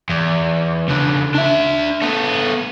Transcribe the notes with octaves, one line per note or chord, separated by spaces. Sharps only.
E2
C#3 D4
D4 E5
A3 B3